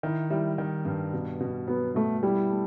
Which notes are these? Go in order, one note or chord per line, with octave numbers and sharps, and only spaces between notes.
D#3 E4
G3 E4
D#3
G2
B2
B2
F#3 B3
B2 A3
G3 E4
A3